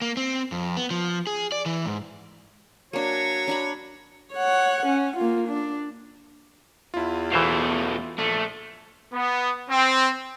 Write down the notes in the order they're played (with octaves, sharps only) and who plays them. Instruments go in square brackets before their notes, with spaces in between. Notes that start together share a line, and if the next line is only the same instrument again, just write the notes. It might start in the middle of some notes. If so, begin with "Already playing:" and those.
[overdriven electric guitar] A#3
C4
F2
B3
F3
G#4
D5
E3
G#2
[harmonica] F#3 C#5 [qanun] A#3 D4
[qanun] D4 A#5 B5
[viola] C#5 F#5
C#4
A#3 F4
D4
[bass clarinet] E2 [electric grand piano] E4 F4
[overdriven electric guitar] B2 A3 [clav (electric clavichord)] E3 C5 F5
[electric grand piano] A#1 [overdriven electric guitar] A3
[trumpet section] B3
C4